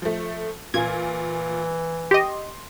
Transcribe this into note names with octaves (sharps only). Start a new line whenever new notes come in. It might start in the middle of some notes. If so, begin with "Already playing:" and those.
F3 A3
A#2 E3 F4 G#5 G#6
G4 D#5 C6